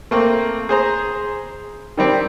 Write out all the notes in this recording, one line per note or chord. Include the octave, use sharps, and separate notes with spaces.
A3 A#3 C4
G#4 C5 A#5
D#3 G3 C4 D4